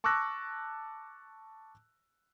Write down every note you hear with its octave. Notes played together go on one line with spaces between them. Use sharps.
A5 C#6 D6 E6 F#6 A#6